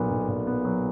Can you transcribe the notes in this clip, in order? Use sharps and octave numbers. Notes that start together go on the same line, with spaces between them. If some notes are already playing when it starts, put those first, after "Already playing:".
Already playing: B1 A#2 F#3 B3
B1
A#2
B3
F#3